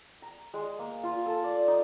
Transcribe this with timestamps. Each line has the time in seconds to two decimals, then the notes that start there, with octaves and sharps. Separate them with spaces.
0.22 A#5
0.54 G#3
0.79 A#3
1.03 F4
1.26 A4
1.44 D5
1.68 D#4